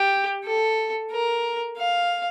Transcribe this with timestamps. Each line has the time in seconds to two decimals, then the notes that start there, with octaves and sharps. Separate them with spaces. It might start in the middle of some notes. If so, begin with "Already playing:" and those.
Already playing: G4
0.45 A4
1.12 A#4
1.78 F5